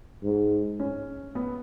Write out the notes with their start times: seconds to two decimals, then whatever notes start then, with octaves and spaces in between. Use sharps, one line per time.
0.23 G#2
0.80 C#4
1.35 B3